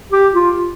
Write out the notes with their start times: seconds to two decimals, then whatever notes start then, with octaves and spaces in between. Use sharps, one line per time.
0.12 G4
0.34 F4